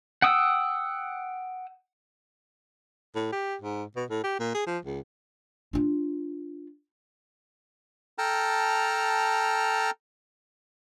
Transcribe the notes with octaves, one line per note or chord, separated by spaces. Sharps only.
F#5 G5 D#6 E6
A2
G4
G#2
B2
A2
G4
A#2
G#4
F3
C#2
D4 F4
A4 G5 A5 A#5 F6